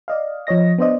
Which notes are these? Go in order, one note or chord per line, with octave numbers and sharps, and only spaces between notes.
D5 D#5 F5
F3 C#5 D#5 A#6
B3 D4 C5 D5 D#5